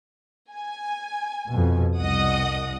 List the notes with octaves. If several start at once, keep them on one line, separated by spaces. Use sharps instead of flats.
G#5
F2 B2
C2 D#5 F#5 D#6